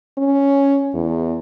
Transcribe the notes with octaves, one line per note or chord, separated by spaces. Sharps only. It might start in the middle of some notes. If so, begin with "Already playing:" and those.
C#4
E2